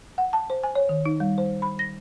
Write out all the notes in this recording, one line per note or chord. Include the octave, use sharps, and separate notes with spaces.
F#5
A5
C5
G#5
C#5
D#3
D#4
G3
C5
B5
A#6